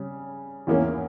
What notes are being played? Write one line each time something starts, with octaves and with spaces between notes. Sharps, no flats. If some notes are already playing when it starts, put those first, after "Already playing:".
Already playing: C#3 G3
E2 E3 A#3 C#4